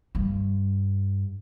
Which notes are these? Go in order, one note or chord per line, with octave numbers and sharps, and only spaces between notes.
G2